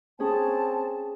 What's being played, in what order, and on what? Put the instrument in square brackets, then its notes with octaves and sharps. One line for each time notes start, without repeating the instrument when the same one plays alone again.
[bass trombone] C4 [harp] C#4 G#4 [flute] A5